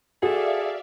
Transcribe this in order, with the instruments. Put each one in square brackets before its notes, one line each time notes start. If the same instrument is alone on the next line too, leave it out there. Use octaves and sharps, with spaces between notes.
[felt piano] F#4 [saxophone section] G#4 A4 [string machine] D5 E5 F5